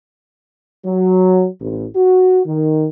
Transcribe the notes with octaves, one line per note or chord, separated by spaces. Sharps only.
F#3
A1
F#4
D#3